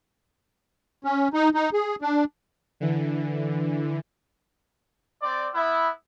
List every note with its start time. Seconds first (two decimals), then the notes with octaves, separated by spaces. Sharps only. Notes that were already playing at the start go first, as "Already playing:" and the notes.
1.04 C#4
1.33 D#4
1.54 D#4
1.73 G#4
2.02 D4
2.80 D3 E3
5.22 C4 D5
5.54 B3 E4